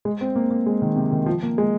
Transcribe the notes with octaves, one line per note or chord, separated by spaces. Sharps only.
G#3
C4
A#3
A#3
G#3
D#3
C3
D#3
F3
A#3
G#3